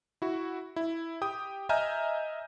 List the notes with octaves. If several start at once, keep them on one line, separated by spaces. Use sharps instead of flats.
E4 F#4
E4
G4 G5 D#6
D#5 E5 G#5 A#5 F6 G6